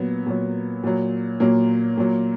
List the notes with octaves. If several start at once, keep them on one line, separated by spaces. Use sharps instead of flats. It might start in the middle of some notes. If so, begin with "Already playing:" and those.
Already playing: A#2 F#3 B3
A#2 F#3
A#2 F#3
A#2 F#3 A#3
A#2 F#3